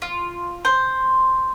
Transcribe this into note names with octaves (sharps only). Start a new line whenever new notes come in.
F4
C5